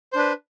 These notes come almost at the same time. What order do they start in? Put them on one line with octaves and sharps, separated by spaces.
C5 D4 B4